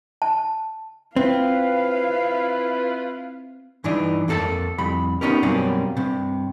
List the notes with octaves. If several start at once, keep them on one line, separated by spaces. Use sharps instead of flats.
A5
C4 E4 F4 B4 F5
G2 E3 D4 D#4
F2 A#3 A4 B4 A5
C2 F2 B5
B3 C#4 D#4 G4 A#4
F#2 B2 G3 A#3 C4 C#4
G2 C3